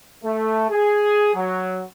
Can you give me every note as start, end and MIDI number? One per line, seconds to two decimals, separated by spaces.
0.24 0.67 57
0.70 1.32 68
1.35 1.82 54